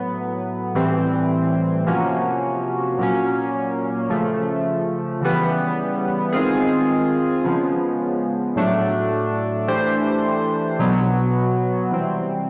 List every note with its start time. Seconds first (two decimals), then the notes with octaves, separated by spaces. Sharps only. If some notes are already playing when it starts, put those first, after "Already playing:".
Already playing: A2 F#3 B3
0.75 A2 E3 G3 C4
1.87 C3 F3 A#3 C#4 F#4
2.99 A#2 F#3 A#3 C#4
4.10 C#3 F3 A3
5.21 C#3 E3 G3 B3
6.33 D#3 G#3 C4 F4 G#4
7.44 C#3 F3 G#3 B3
8.56 A2 F#3 A3 D4
9.67 E3 A3 D4 G4 C5
10.79 B2 F#3 B3
11.91 C3 E3 G3 C4